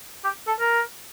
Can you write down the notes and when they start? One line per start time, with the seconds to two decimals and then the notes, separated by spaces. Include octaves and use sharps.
0.24 G4
0.47 A4
0.59 A#4